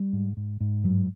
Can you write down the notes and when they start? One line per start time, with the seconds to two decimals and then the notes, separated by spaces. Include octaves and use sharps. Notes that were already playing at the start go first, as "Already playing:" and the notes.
Already playing: G3
0.13 G#2
0.37 G#2
0.60 G#2
0.84 G2 F#3